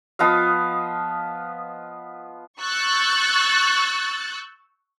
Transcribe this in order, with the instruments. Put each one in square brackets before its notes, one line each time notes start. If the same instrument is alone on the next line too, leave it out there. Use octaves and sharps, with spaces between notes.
[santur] F3 B3 D#5 F5
[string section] C#6 E6 F#6 G6 A6